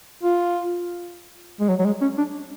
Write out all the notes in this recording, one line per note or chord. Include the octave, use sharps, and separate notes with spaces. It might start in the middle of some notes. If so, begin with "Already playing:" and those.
F4
G#3
F#3
F#3
G#3
C#4
D4